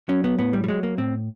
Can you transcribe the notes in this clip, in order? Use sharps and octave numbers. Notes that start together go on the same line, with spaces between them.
F#3 C#4
B3
A2 B3
G3
G3
F#3 G#3
A#3
A2 C4